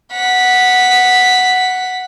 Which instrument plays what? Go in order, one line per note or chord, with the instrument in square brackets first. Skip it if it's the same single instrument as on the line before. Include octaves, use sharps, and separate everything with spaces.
[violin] F#5 B6